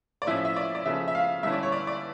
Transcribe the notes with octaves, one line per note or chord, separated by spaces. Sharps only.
D5
A2 F3 C#4 E4 E5
E5
D5
D5
C#3 F3 A3 E5
E5
F5
G2 D3 A3 C#4 E4 E5
D5
C#5
D5
D5